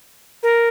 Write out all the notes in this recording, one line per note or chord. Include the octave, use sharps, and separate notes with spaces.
A#4